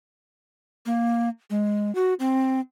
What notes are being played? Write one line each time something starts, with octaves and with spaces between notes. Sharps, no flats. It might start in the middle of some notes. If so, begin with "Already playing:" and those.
A#3
G#3
F#4
C4